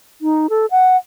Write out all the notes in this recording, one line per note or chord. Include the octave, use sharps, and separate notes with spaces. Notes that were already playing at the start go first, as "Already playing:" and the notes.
D#4
A4
F#5